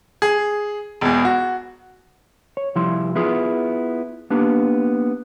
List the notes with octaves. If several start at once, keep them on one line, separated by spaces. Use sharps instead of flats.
G#4
E1 E2
F#4
C#5
C2 F3 G3 E4 C6
B3 E4 F4 G#4
A#3 B3 D4 G4